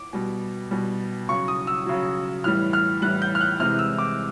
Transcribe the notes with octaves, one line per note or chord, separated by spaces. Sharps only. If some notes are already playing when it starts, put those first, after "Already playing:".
Already playing: D6
B2 G3
B2 G3
C#3 F#3 C#6
D#6
E6
C#3 F#3
A2 E3 G3 F6
F6
A2 E3 G3 F#6
G6
F6
F#6
C3 E3 G#3 F6
E6
D6